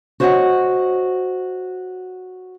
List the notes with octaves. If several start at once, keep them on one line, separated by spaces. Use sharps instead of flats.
F#4 C5 C#5 D#5 E5 F#5